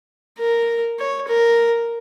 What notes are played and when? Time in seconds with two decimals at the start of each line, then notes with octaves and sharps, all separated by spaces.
0.39 A#4
0.99 C#5
1.28 A#4